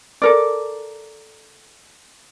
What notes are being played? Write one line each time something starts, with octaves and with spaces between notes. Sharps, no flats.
A4 A#4 D5